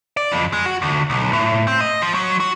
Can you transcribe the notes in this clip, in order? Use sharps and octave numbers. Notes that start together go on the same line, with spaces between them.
D5
F2
G#3
F#4
D2
B1
A2
C4
D#5
F3
F#3
F#4